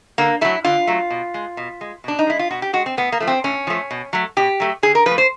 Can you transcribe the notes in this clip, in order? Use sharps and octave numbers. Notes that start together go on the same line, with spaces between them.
D3 A#3
F#3 A3 E4
D3 F4
F#3 A3
B2
G#3
B2
G#3
B2 D4
D#4
G#3 E4
F4
B2 F#4
G4
G#3 F#4
C4
A2 B3
A#3
F3 A3
C4
A2 C#4
F3 A3
B2
F#3 A3
B2 G4
F#3 A3
D3 G#4
A#4
F3 B4
A3
C5